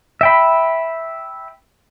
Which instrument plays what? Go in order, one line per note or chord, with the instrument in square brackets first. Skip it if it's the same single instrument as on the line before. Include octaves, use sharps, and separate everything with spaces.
[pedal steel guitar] E5 G5 B5